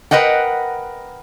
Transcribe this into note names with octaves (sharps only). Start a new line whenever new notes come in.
A#4 B4 D#5 F#5 G5